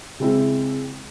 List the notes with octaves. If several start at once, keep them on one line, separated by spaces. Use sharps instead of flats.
C#3 G#3 C4 E4